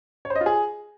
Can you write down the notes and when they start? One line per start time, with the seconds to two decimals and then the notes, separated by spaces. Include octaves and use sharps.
0.25 C#5
0.30 C5
0.36 D#5
0.41 F4
0.46 G#4